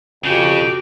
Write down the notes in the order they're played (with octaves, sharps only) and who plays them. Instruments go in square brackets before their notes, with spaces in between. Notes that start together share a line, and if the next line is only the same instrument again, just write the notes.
[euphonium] F2 [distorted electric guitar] C#3 [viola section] F#4 G4 [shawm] G5